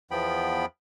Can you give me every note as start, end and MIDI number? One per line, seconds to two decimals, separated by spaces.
0.11 0.66 40
0.11 0.66 53
0.11 0.66 59
0.11 0.66 79
0.11 0.66 83